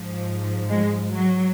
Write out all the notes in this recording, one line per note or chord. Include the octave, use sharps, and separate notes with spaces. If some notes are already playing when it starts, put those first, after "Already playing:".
Already playing: G#2 F3
G#3
F#3